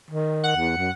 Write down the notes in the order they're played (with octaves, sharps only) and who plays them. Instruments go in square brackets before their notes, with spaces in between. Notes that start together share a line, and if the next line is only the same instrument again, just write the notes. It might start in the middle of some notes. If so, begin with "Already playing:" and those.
[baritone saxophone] D#3
[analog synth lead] F#5
[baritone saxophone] E2
F#2